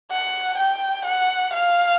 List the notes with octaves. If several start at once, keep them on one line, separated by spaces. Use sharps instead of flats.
F#5
G5
F#5
F5